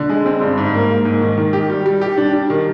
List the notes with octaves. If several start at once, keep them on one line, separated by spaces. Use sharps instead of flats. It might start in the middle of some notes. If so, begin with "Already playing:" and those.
Already playing: D3
G#3
C4
G2
G#2
A#3
A#3
G#2
D#3
D#3
G4
G3
G3
G4
D4
G3
D#3